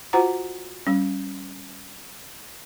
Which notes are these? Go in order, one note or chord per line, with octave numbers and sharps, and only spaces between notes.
F4 F#4 C5 F#5 A#5
G3 C#4